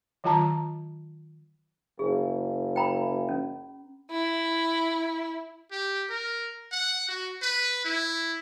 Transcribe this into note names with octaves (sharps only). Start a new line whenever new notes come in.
D#3 F#3 F4 A5 A#5
F#1 G#4
G5 A#5 B5
C#4
E4
G4
A#4
F#5
F#4
B4
E4